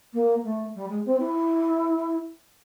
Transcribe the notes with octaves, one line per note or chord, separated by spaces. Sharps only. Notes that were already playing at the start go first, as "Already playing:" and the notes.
A#3
A3
G3
G#3
C4
E4